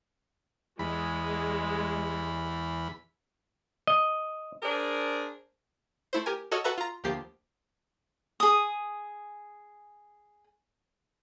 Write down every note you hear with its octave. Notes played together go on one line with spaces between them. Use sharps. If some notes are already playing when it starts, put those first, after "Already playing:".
E2 G#3 B5
D#5
D4 G#4 A#4 C5 D5
A3 E4 C5
G4 A#4 G#5
F#4 A4 C#5 D#5 F#5 F6
F#4 A4 B4 E5 A#5
F4 A#5
D2 F3 A#3 G4 C7
G#4 D#6